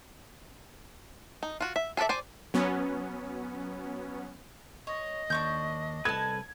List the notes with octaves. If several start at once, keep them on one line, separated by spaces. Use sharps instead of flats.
D#4
F4 F#4
E5
G#4 A4 B4 D5 E5
C5 D5 G#5
F#3 B3 C#4
C#5 D#5
D#2 D4 C#6 G6
C2 A4 B4 A5 G#6